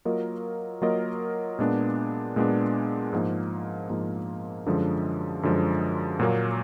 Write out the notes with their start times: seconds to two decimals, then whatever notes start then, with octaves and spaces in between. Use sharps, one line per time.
0.05 F#3 A#3 F4 A#4 D#5
0.82 F#3 A#3 F4 A#4 D#5
1.59 A#2 G#3 B3 D4
2.36 A#2 G#3 B3 D4
3.13 G#2 F3 A#3
3.90 G#2 F3 A#3
4.66 F#2 D3 F3 G#3
5.43 F#2 D3 F3 G#3
6.19 A#2 F#3 A#3